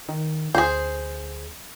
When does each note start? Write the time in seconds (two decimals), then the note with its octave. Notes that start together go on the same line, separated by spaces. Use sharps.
0.09 D#3
0.55 D2 G#4 C5